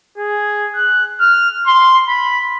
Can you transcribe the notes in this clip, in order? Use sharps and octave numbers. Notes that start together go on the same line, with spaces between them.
G#4
F#6
F6
C6
B5